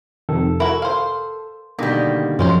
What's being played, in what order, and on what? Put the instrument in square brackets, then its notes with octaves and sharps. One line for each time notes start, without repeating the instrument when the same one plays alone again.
[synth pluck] F2 C3 D#3 [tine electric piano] A4
[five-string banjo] E4 F#4 [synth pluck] A#4
[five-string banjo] C5 F5
[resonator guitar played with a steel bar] B2 G3 [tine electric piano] D3 D#3 A#3
[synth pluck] F#2 F3 [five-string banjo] G#3 C#4 C5